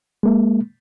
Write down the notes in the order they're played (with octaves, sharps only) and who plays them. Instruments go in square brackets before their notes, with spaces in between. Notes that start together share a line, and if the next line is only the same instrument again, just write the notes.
[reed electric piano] G#3 A#3